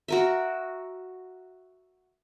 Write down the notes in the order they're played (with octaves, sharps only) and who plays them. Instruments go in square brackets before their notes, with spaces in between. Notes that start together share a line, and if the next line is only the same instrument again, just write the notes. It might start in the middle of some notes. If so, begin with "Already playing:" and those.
[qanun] F#4 A#4 E5